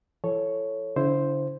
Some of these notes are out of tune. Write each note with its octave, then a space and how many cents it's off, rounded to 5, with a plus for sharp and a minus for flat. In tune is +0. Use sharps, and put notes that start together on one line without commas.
E3 +40 A4 +0 C#5 +0
D3 -45 E4 +0 C5 +0